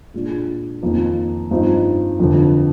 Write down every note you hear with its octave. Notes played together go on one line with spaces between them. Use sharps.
A#2 G#3 D4
F2 D#3 A#3 D#4
G2 F3 C4 D#4
F1 F2 D3